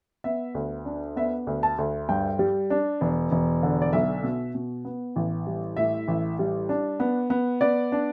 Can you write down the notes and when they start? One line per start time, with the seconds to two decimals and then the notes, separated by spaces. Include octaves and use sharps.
0.24 B3 E5
0.55 D2
0.85 D4
1.16 B3 E5
1.47 D2
1.63 A5
1.78 D2
2.09 G2 G5
2.39 G3
2.70 D4
3.01 E1
3.31 E1
3.63 D3
3.82 D5
3.93 B1 E5
4.24 B2
4.55 B2
4.85 B3
5.16 A1
5.47 G3
5.77 A2 E5
6.08 A1
6.39 G3
6.69 D4
7.00 B3
7.30 B3
7.61 B3 D5
7.92 D4